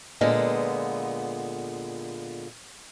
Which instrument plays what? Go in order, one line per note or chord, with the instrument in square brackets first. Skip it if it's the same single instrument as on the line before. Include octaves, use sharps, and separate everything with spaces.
[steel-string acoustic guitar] A#2 D3 G#3 B3